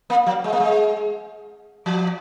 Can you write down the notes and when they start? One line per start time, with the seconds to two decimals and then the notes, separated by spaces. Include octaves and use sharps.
0.10 A#3
0.26 F#3
0.44 G#3
0.53 A#3
0.60 G#3
1.86 F3